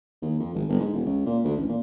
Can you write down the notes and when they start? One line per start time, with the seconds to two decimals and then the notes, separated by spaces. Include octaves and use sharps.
0.22 D#2
0.39 F2
0.54 G#1
0.68 G1
0.80 G#2
0.93 E1
1.05 C#2
1.26 A#2
1.44 D2
1.57 A1
1.69 A#2